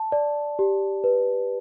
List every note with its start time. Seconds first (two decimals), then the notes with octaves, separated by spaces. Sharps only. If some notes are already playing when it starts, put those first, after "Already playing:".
Already playing: A5
0.12 D5
0.59 G4
1.04 B4